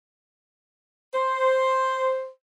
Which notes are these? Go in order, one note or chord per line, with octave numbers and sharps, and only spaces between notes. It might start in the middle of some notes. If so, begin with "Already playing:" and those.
C5